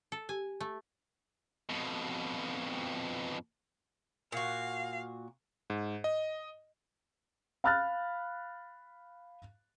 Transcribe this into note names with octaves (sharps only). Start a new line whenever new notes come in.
A4
G4 G#5
A3
F2 B2
A#2 F#4 F5
G#2
D#5
F5 B5 F6 F#6 A6